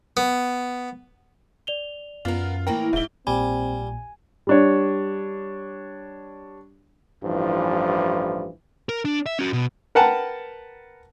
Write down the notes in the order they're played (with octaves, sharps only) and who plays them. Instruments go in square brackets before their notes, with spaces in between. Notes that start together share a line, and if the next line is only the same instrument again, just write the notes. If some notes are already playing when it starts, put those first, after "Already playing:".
[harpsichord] B3
[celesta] D5 F7 G7
[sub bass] F#2 [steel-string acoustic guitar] B3 A#4 [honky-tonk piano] F4
[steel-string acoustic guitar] A2 E3 A#3 [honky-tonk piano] A#4 [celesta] G5
[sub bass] D#1 [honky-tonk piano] G#2 E4 [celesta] E5 G7
[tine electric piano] A#1 A#2 [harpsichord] G3 [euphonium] C4 [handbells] G#5
[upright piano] G3 D4 C#5
[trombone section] A1 G2 E3 F3
[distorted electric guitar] A#4
D4
E5
C#4 F#4
B2
[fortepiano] A#4 B4 F#5 G5 A5 A#5